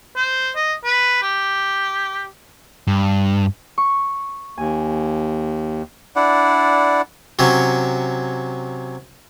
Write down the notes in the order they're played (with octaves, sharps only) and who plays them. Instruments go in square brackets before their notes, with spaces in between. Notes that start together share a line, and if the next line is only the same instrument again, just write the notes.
[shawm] C5
D#5
B4
G4
[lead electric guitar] G2
[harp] C#6
[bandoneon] D#2 [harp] G#5
[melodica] D4 E4 D5 F#5
[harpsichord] C3 F#3 C#4